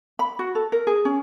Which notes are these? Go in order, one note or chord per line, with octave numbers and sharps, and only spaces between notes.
B5
F#4
A4
A#4
G#4
C#4